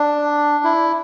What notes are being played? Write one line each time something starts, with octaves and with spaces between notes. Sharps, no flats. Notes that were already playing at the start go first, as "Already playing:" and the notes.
Already playing: D4
E4